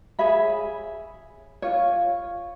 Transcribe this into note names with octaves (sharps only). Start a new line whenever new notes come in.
G#4 C#5 E5 B5
F4 C#5